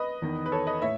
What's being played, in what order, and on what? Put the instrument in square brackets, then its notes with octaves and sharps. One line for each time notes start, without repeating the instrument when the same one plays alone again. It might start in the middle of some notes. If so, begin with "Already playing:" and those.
Already playing: [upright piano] B4 D#5
E2 D#3
B4
A4 C#5
B4 D#5
A2 C#5 E5